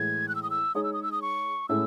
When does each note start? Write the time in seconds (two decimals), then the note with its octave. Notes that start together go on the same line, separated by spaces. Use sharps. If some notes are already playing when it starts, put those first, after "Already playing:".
Already playing: A2 E3 G#3 G#6
0.28 F#6
0.35 E6
0.43 D#6
0.50 E6
0.75 G#3 D#4 G#4 C#5 D#6
0.84 E6
0.93 D#6
1.03 E6
1.12 D#6
1.22 C#6
1.69 A2 G#3 C#4 E4 A4 E6